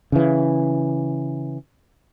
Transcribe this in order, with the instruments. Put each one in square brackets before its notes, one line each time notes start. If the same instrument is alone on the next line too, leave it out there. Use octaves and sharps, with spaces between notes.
[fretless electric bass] C#3 E3